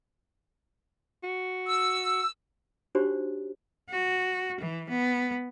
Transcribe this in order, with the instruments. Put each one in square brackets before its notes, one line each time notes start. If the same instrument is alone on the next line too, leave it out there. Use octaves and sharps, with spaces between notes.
[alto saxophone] F#4
[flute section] E6
[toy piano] D4 D#4 F#4 G4 C5 C#5
[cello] F#4
E3
B3